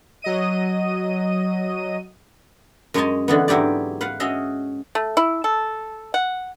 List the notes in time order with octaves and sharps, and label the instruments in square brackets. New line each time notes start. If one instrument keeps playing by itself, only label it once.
[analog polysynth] F#3 D#5 D#7
[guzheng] F#2 G#3 C#5 D#5 G#5 A5
D3 E3 B3
G#2 F#3 E4 G4 D5
B4 F5 F#5
C#4 F#4 G#4 D#5 E5
[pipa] A3
E4
A4
F#5